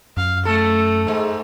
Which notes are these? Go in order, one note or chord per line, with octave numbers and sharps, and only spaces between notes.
F#2 F5
A3 A4
G#2 G#3